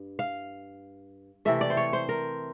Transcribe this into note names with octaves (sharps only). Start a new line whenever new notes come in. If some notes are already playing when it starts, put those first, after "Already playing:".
Already playing: G2
F5
C3 E3 A3 E5
D5
C5
C#5
C5
A#4